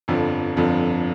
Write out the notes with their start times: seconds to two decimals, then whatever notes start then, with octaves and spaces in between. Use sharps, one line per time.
0.08 G1 F2 D3 F3
0.56 G1 F2 D3 F3